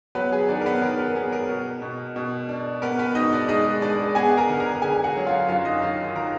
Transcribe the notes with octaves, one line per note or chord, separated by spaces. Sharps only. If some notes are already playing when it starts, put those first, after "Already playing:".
F#3 B3 B4
G#4
D#3 D4 D5
A#4
B3 B4
D#3 A#4
A#4
B3 G#4
A#4
B2
B2
B2
D4
B3 A#4
B3 B4
B2 D#4 D#5
D4 D5
G#3 D#4 D#5
G#3 D4 D5
B3 G#4 G#5
A#4 A#5
D3
A#4 A#5
D3 G#4 G#5
F#4 F#5
F#3
F4 F5
F#2 F4 F5
D#4 D#5
D#3 F4 F5
D#3 A#4 A#5